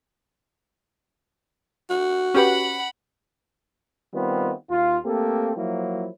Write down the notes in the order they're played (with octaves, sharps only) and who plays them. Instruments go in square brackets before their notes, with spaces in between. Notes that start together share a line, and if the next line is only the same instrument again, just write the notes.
[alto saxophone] F#4
[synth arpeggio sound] C#4 G4 B4 [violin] F#5 B5
[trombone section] D#3 G3 B3 C4 F4
D#2 F4
A3 A#3 C4 G4 A4
F3 F#3 A#3 E4